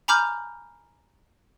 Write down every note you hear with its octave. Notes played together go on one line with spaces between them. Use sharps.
G#5 A#5 B5 D6 F6 G6